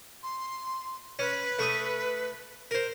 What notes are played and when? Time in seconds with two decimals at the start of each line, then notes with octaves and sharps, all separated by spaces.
0.23 C6
1.19 C#4 B4
1.59 A3 C#6 D#6
2.71 A#4 C5